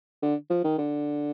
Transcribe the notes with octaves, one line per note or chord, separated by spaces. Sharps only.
D3
F3
D#3
D3